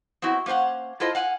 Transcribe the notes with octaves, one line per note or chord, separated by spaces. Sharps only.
B3 C4 E4 F#4
A#3 C#4 C5 F5 F#5
E4 F4 A4 C5 D#5
F5 F#5 G#5